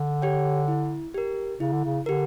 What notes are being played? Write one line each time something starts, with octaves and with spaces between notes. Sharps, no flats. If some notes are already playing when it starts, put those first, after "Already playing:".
Already playing: D3
G4 C#5 G5
E4
G4 A#4
C#3 E4
D3
C#3
D3 G4 A#4